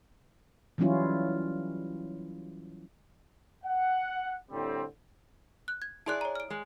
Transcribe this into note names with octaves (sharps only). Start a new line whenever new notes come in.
E3 F#3 G3 C#4 E4 F4
F#5
A2 D3 G3 C4
F#6
G#6
E4 G#4 D5 A5 C6 F#6
C#5 A#5
F6 D7
G#3